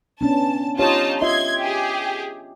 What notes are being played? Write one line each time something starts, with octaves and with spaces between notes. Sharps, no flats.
B3 C#4 D4 A5
D#4 F4 G4 C#5 A5
F4 D#5 E5 C6 G#6
G4 G#4